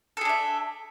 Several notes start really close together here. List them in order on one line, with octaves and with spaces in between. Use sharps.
A4 G#4 D4 E5